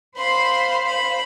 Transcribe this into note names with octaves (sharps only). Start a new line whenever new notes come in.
C5 F5 B5 C6
B5